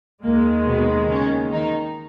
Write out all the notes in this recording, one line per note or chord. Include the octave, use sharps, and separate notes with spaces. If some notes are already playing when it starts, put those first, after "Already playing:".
D#2 D#3 G#3 A#3
B2 B3
C#3 C#4
D#3 D#4